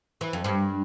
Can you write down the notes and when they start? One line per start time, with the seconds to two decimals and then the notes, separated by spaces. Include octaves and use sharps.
0.21 E3
0.33 F2
0.44 G2